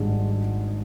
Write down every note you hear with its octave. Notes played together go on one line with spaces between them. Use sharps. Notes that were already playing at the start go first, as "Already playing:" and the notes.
Already playing: G#1 G#2 G3 D4 G#4